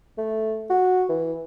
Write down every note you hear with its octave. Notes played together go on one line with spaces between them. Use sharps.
A3
F#4
E3